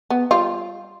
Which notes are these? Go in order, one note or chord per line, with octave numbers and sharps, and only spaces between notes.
B3
G3 F4